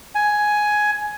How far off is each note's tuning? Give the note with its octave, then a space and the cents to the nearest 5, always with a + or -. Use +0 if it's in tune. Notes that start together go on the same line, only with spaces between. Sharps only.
G#5 +10